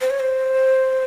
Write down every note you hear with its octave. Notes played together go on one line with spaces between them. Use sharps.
C5
C#5
C5